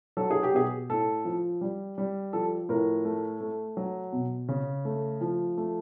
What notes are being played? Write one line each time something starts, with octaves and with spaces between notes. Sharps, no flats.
F#3 A4
G#4
G4
B2 G#4
A2 A4
F3
G3
G3
F3 A4
A2 A#4
A3
A3
F#3
B2
C#3
A3
F3
A3